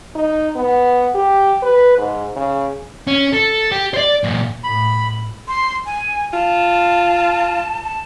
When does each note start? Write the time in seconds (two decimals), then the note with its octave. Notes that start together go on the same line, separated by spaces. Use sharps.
0.15 D#4
0.56 B3
1.15 G4
1.62 B4
1.98 G#2
2.36 C#3
3.07 C#4
3.33 A4
3.72 G4
3.94 C5 D5
4.24 A#2 E3
4.64 A2 B5
5.48 C6
5.86 G#5
6.33 F4 A5
7.83 A5